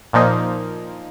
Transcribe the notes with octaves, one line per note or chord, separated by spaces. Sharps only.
A#2 F3 A#3 D#4